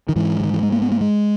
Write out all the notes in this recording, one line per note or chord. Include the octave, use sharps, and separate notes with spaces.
D#3
G#2 E3
E3
D#3
E3
G#3
A#3
B3
A#3
G#3